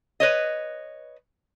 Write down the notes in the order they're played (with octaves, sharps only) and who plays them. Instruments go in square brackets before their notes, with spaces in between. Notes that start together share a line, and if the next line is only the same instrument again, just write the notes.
[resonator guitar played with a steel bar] B4 C#5 D#5